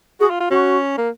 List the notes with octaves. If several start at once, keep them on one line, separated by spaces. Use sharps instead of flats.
F#4 G#4
F4
F4
C#4 F#4
A#3